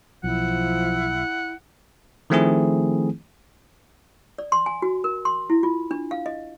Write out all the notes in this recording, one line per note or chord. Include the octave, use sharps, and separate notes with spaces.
B1 F3 E4 F#5
D#3 F3 A3 C4 E4 G#4
D5
C6
G#5
F#4
A#4
C6
E4
F4
D4
F5
D#5